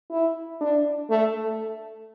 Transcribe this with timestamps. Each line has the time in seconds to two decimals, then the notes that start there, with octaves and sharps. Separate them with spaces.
0.11 E4
0.61 D4
1.10 A3